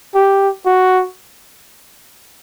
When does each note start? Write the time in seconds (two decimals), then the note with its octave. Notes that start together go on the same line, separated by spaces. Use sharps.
0.15 G4
0.66 F#4